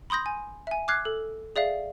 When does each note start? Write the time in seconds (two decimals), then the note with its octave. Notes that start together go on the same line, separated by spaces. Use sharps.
0.10 B5 C6 D#6 G6 A#6
0.26 G#5
0.67 E5 G#5
0.88 D6 F6 F#6 G#6 C7
1.05 A4
1.56 G#4 D5 E5 F5